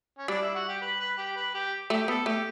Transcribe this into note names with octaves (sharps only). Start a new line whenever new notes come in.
C#4
G3 D4
E4
F#4
G4
B4
B4
G4
B4
G4
A3 G4
B3 A4
A3 G4